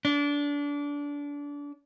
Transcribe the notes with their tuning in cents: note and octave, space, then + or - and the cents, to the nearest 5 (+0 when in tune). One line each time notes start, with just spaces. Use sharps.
D4 -25